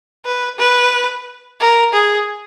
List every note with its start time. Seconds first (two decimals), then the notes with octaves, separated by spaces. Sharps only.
0.25 B4
0.58 B4
1.60 A#4
1.93 G#4